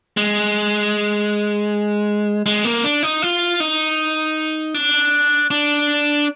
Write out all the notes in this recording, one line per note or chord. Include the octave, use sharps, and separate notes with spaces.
G#3
G#3
A#3
D4
D#4
F4
D#4
D4
D4